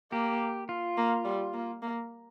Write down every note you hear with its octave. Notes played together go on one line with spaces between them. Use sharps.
A#3 G4
F4
A#3
G3
A#3
A#3